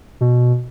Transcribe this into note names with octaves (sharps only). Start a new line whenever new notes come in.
B2